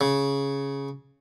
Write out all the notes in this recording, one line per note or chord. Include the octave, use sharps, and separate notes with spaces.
C#3